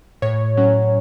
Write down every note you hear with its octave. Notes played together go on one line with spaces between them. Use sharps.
A2 C#5
F#3 C#4